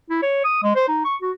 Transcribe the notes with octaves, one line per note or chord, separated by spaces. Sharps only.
E4
C#5
D#6
G#3
C5
D#4
C#6
F#4